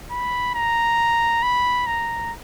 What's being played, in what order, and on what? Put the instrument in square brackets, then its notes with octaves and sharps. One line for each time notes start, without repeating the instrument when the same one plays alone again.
[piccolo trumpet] B5
A#5
B5
A#5